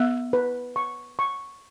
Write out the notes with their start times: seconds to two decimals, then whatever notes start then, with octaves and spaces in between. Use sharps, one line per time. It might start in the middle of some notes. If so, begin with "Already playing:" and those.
Already playing: B3 E5
0.33 B4
0.76 C#6
1.19 C#6